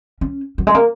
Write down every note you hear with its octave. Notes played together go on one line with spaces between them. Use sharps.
C#4
F#3
G#3
A#3